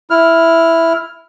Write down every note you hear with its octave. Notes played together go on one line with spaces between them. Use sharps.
E4 F6